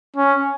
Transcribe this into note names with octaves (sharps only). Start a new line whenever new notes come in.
C#4